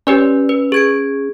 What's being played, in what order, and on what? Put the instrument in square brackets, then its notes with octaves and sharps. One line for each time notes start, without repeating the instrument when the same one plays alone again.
[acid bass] C#4 [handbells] G4 B4 D5
[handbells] B4
G#4 G#6 D7